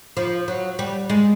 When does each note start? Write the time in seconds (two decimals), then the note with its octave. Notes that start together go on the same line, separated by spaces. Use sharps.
0.17 F3
0.48 F#3
0.79 G3
1.10 G#3